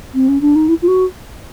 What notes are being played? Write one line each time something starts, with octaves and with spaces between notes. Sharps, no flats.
C4
C#4
D4
D#4
E4
F4
F#4